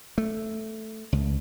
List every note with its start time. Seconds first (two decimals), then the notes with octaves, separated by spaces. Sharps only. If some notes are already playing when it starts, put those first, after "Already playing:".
0.18 A3
1.12 C#2